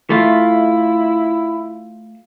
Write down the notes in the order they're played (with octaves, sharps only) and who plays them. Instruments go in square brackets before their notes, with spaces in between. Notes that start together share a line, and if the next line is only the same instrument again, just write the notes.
[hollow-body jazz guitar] A3 F4 [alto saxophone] E4